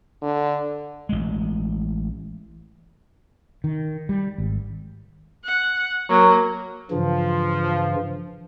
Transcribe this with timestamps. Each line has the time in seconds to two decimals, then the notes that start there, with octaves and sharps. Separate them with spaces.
0.22 D3
1.09 A1 G#3
3.64 D#3
4.09 G3
4.38 G#1
5.44 F#5
6.10 F#3 A#3
6.91 G2 C#3 E3 F3